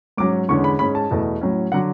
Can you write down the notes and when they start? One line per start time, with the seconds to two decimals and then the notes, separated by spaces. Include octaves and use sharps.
0.17 G#2 F#3 C#4 D6
0.48 E2 D3 G#3 C#4 C#6
0.64 B5
0.79 G#2 G#3 C#4 B5
0.95 A5
1.11 E2 B2 A3
1.41 A2 F#3 C#4
1.72 D3 F#3 F#5